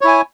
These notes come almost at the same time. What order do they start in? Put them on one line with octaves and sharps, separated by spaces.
C#5 E4 G#5